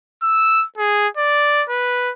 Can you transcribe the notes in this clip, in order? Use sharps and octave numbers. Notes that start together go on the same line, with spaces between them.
E6
G#4
D5
B4